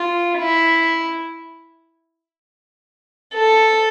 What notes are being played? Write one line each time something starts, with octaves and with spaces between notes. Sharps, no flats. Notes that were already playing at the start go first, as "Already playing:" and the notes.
Already playing: F4
E4
A4